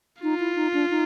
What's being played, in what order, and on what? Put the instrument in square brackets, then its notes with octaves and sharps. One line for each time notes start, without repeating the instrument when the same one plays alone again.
[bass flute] D#4 [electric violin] F4
[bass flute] E4
D#4
D4
D#4